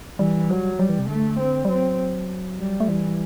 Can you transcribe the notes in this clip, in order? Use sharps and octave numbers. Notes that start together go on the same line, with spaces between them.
E3 G3
F#3
F#3 G3
E3
C3
D3 A3
C4
G3
F#3 C4
G3
A3
E3 G3